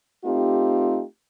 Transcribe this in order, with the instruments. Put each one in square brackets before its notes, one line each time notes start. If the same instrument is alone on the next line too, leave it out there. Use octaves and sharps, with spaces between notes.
[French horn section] A3 C4 D#4 F4 G4